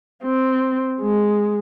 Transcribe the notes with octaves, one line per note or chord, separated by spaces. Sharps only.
C4
G#3